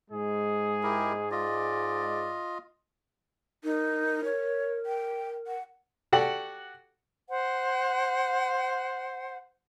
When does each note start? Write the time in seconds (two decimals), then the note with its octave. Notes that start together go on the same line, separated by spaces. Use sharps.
0.11 G#2 G#3 G#4
0.83 E4 G4 A#4
1.31 F4 D5 D#5
3.64 D#4 A#4
4.25 C#5
4.86 G5
5.47 F#5
6.12 F#4 G4 A4 D5 F#5
7.29 C5 F#5